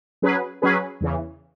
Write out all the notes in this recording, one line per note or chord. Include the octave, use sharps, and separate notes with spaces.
F#3 C#4 G#4 B4
F#3 C#4 G#4 B4
E2 C#3 E3